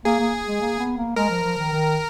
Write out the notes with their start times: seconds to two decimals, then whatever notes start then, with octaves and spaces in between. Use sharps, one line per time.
0.05 A#3 G#4
0.20 A#3
0.47 G#3
0.61 A#3
0.79 B3
0.97 A#3
1.16 G#3 A#4
1.30 F3
1.44 F3
1.58 D#3
1.72 D#3